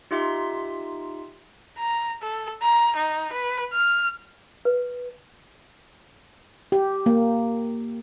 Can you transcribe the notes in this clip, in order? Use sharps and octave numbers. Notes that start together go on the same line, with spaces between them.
D#4 F4 G4 E5 C6
A#5
A4
A#5
D#4
B4
F6
B4
G4
A#3